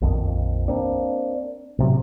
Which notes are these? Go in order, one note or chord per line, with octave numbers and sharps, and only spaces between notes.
A#1 F2 D#3
A#3 C4 D4
A2 C3 F#3